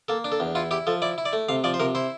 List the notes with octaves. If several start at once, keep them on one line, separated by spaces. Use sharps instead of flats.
A#3 A4
D4
A4
E2
E4 F4
E4 G4
F3 A4
E4 D5
E4
D5
A3
C3 F5
F3 D5
C5
C3 A#4
E4 C5